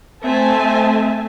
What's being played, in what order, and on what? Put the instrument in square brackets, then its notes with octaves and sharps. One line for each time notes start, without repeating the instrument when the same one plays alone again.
[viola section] A3 C4 E5 G#5 A5